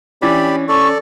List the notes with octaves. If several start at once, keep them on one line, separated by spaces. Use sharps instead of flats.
E3 C#4 D4 G4 D5 B5
C#4 A4 D5 C#6